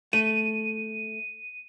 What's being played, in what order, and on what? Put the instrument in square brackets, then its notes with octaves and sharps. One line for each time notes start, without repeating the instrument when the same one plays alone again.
[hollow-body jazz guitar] A3 [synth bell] D#7